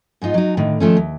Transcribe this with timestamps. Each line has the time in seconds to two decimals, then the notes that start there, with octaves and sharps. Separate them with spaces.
0.22 G#2 B3 D#4 F4
0.34 F#3 D#4
0.57 A2 D3 D#3
0.80 D#3 F3 A3 C#4
0.97 D#2